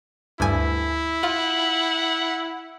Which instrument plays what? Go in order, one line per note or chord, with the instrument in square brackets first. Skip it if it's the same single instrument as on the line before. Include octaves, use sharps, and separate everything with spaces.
[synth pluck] D2 G2 G#5 [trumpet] E4
[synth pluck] F4 [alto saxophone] F#5